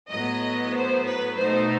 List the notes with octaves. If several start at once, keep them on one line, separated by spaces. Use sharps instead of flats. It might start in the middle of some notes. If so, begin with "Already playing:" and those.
A2 F#3 B3 D#5
C5
B4
B2 A3 D#4 C5